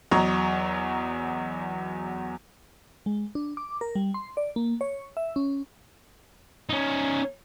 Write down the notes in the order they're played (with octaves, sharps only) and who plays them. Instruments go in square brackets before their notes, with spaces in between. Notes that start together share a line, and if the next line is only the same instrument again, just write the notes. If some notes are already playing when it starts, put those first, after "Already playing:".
[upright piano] E2 F#3 D#5 A#5 C#6
[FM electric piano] G#3
D4
D6
A#4
G3
C6
D5
A#3
C#5
E5
C#4
[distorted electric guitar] C#4 D#4